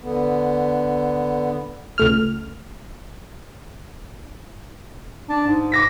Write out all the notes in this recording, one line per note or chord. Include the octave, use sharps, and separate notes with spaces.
D3 B3
C#2 A3 F6
D4
G#2
D6 A#6 B6